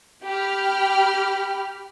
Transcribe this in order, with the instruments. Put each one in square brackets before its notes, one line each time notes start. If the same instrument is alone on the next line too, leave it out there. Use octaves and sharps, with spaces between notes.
[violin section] G4 B5 F6